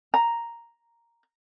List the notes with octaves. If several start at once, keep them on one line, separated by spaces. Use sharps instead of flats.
A#5